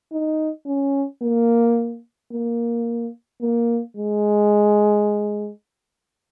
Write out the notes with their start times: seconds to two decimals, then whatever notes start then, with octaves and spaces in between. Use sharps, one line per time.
0.12 D#4
0.66 C#4
1.22 A#3
2.32 A#3
3.42 A#3
3.97 G#3